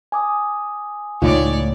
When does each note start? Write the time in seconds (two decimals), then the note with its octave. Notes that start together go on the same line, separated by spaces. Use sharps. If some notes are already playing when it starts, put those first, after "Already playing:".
0.12 G#5 D6 D#6
1.22 C#2 A2 A3 D#4 F4 C#5 D5